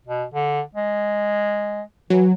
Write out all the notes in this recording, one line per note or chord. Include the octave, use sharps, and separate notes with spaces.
B2
D3
G#3
E3 F#3